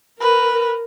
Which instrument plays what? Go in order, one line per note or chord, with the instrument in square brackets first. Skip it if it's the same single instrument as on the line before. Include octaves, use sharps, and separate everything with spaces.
[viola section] A#4 [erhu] B4